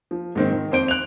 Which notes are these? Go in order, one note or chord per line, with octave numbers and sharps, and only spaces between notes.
F3
G#2 D#3 C4
D#3
F2 C5 D7 G7
F#6 F7